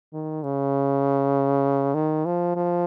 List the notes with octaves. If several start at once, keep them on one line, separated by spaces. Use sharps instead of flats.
D#3
C#3
D#3
F3
F3